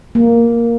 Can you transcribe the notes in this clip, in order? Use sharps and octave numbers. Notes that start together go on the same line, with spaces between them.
A#3